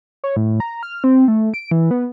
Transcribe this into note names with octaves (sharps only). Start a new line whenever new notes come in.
C#5
A2
A#5
F6
C4
A3
D7
E3
B3